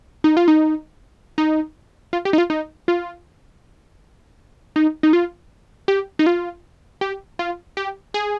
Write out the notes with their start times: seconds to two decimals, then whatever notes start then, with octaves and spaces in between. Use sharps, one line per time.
0.24 D#4
0.37 F4
0.48 D#4
1.38 D#4
2.13 F4
2.25 G4
2.33 D#4
2.38 F4
2.50 D#4
2.88 F4
4.76 D#4
5.03 D#4
5.13 F4
5.88 G4
6.19 D#4
6.26 F4
7.01 G4
7.39 F4
7.77 G4
8.14 G#4